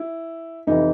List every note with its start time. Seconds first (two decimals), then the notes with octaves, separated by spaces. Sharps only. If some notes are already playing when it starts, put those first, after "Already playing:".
Already playing: E4
0.67 F2 C3 E3 D#4